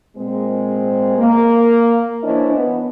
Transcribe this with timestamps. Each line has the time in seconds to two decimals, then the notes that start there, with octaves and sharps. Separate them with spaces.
0.17 A#2 G#3 C4
1.18 A#3
2.23 E3 C#4 D4 E4 C5 D#5
2.54 B3